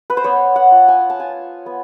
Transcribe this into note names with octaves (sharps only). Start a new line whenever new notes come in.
B4
C5
B3 C#5
F#5
F4
G#5
A5
F4 G#5
B3